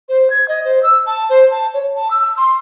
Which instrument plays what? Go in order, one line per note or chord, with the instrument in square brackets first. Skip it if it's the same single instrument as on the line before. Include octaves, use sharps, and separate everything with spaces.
[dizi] C5
G#6
D#5
C5
E6
A5
C5
A5
C#5
A5
E6
C6